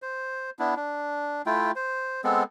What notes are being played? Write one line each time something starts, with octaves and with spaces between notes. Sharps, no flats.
C5
B3 D4 E4
D4
A3 E4 F4 G5
C5
G#3 B3 C4 A4